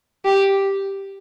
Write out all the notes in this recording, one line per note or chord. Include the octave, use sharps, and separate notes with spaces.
G4